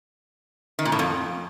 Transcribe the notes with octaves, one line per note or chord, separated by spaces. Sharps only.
D#3
A#2
A2
F2